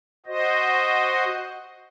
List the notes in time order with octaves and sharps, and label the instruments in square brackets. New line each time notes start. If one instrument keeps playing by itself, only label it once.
[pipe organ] F#4 C5 D#5